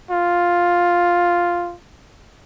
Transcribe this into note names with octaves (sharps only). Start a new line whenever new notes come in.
F4